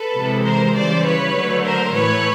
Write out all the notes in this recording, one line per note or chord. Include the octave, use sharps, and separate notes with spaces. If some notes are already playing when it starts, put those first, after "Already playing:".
Already playing: A4 B4
C3 E3 G#3
A#4 C5
C#3 E3 G3 C5 D5
B4 C#5
D3 F#3 A3
A#4 C5
A2 E3 A3 B4 C#5